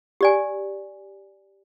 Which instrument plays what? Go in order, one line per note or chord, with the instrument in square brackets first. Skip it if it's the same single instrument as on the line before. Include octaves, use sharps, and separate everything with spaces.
[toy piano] G4 D5 G#5